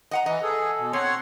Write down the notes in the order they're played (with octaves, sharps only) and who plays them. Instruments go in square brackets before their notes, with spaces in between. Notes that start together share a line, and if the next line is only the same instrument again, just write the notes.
[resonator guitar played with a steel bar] D#5 F#5 A#5
[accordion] E3 [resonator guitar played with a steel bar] D#5
[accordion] G#4 [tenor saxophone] A4
[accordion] B2
[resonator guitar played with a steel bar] C4 [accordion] C#5 F#5 C6